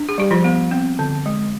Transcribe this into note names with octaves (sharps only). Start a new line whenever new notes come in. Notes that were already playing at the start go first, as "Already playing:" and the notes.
Already playing: D4
G#4
G3 G4
F3 F4
B3
C4
D3
G#3